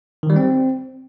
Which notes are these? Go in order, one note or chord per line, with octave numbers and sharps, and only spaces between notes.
D#3
G3
C4